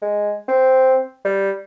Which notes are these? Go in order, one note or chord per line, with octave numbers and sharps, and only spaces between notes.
G#3
C4
G3